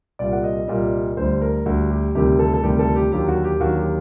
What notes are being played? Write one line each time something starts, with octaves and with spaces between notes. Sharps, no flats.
C2 A#2 G3 D5
F#5
D#5
C2 A#2 G3
D2 D3 G3 C5
A#4
D2 D3 G3 F#4
G4
D2 C3 D#3 G3 G4
A4
A4
D2 C3 D#3 G3 G4
A4
G4
D#2 D3 F#3 G4
F#4
G4
D#2 D3 F#3 F#4
G4